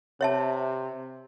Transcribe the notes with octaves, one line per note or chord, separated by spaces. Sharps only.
C3 C#5 E5 A5